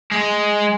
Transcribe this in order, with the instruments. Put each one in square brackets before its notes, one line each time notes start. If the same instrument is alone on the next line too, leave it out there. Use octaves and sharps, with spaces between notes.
[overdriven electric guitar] G#3